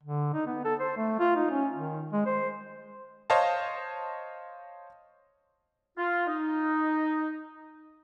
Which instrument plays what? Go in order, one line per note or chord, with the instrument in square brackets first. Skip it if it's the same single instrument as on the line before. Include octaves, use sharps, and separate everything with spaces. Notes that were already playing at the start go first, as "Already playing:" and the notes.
[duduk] D3
D#4
B3
A4
C5
A3
F4
D#4
C#4
D#3
G#3
C5
[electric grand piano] C5 C#5 D#5 F5 A5
[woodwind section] F4
D#4